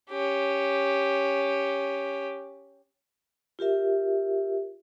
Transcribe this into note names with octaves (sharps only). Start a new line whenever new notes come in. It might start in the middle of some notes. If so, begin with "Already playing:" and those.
C#4 G4
F4 G4 A#4 E5